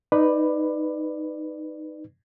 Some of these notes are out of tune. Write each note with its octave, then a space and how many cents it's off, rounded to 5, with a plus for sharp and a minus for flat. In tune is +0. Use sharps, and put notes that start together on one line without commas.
D#4 +0 B4 +5 D5 +15